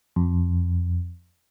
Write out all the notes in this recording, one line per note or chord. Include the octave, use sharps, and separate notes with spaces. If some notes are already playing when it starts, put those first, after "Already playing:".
F2